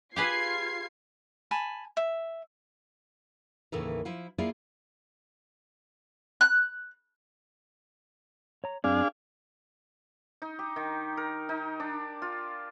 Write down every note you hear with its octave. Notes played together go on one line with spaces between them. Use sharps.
F4 G4 G#4 B4 G#6 C7
G#5 A5 B5
E5
D#2 A2 C#3 E3 A4 A#4
F3 E4 F4
A#3 E4 F4 G#4 D5
F#6
C#5 A#5
F#2 C4 D4 G#4 D5 F5
D#4
G4
D#3
A#4
D#4
D4
F4